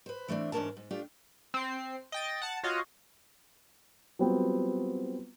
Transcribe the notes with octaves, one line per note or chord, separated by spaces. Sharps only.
B4 C5
E3 A3 C4 D4
E2 G#2 C#4 D4 A#4 A5
G#2
A3 D4 F4 G4
C4 C7
D#5 G5 A6
F#5 A5 C#7
F4 F#4 C#5 D#5 F5
F#3 G3 B3 C4 F4